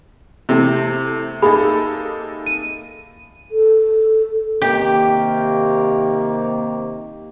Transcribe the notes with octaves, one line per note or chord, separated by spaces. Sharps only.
C3 E3 A3 C4
A#3 D#4 G#4 A4 B5
D#7
A4
C3 D#3 A#3 G4